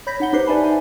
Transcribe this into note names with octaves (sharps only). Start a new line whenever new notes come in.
C#5 B5 G6 A#6 B6
D#4 F#5 G7
D#4 G4 B4 C5 C7
B4 D5 E5 G#5 A5 B5
G#5